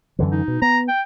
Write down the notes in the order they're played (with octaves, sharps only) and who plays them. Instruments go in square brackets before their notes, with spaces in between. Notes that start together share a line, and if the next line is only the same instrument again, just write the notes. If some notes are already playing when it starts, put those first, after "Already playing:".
[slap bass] F#2 D3 E3
[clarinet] D#4
[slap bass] B2
[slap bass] B3 [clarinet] A#5
[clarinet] G5